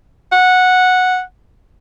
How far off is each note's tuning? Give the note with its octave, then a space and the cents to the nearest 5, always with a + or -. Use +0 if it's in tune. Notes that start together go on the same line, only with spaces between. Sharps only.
F#5 -10